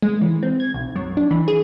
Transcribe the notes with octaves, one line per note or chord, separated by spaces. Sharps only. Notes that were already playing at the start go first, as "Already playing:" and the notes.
G#3
E3
C4
G#6
B1
F#2
D4
E3
G#4